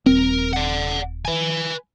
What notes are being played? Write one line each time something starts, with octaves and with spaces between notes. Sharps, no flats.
D#1 C4 A#4
D5 F#5
B4 G#5